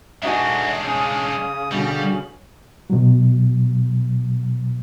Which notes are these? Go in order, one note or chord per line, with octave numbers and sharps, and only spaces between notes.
G#3 D4 D#4 F#4 D5 E5 G#5
C#3 D#6
B2 D3 G3 F#4
B2 F#3